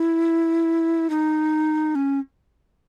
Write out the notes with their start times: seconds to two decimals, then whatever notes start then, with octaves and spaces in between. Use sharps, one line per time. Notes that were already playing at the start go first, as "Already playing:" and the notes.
Already playing: E4
1.10 D#4
1.95 C#4